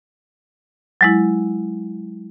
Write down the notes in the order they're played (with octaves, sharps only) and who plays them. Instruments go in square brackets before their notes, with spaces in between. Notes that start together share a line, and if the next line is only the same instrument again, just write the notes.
[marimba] F#3 G#3 E4